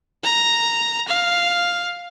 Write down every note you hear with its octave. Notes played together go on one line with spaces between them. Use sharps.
A#5
F5